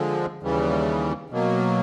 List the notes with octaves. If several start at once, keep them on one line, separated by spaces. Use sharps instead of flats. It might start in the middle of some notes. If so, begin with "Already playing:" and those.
Already playing: D3 F3 G#3
D#2 C#3 E3 G3
B2 F#3 A#3